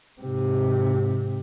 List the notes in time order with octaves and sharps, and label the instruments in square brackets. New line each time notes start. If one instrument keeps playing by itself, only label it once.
[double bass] G#2 C3